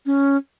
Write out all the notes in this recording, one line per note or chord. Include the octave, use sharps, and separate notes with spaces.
C#4